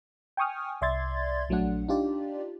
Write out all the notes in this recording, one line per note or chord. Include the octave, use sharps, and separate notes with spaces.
G5 G#5 C#6 D#6 F6
C2 D5 E5 C6 G#6 A6
A#1 F#3 A3 D4 F#5
D4 D#4 F4 G4 D5